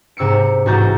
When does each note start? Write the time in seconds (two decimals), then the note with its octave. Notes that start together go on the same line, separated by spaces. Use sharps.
0.17 G#2 C3 E6 C#7 D7
0.66 A1 G#2 F#4 A#5 G6 A6